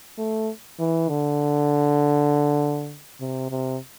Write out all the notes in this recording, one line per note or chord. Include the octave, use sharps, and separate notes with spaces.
A3
E3
D3
C3
C3